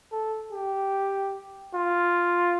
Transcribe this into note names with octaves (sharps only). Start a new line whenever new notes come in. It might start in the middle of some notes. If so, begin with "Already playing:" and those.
A4
G4
F4